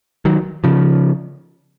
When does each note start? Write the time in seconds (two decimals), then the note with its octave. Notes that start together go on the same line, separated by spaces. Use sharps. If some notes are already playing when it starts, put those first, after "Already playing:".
0.25 D#3 F#3
0.64 C#3 F3